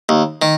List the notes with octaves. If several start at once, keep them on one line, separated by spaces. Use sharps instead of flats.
D#2
D#3